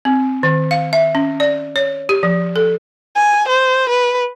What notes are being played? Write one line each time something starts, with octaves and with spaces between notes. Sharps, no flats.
C4
D#3
F5
E5
C#4
D5
C#5
G4
F3
A4
G#5
C5
B4